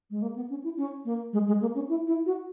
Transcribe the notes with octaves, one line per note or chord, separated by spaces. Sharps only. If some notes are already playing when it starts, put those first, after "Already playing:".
G#3
A#3
B3
C#4
E4
C#4
A#3
G#3
G#3
A#3
C#4
E4
E4
F#4